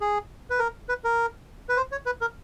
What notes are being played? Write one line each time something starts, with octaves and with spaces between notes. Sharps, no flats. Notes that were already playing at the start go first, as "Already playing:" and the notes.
G#4
B4
A#4
B4
A#4
B4
C5
C#5
B4
A#4